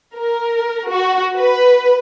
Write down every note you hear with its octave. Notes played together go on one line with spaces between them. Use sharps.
A#4
F#4
B4